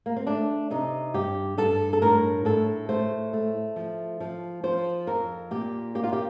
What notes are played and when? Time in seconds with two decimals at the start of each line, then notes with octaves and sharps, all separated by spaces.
0.06 A#3
0.16 C4
0.27 A3 D4
0.71 C3 D#4
1.14 G2 G4
1.58 G2 A4
1.93 A4
2.02 A2 A#4
2.45 A2 A4
2.89 A3 C5
3.33 A3
3.76 F3
4.20 F3
4.63 F3 C5
5.07 F2 A#4
5.51 A#2 G4
5.95 A#3 G4
6.04 F4
6.13 G4